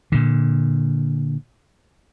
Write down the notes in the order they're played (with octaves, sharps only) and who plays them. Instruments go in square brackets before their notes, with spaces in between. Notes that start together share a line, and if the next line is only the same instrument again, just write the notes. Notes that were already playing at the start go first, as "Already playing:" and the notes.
[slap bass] A#2 D3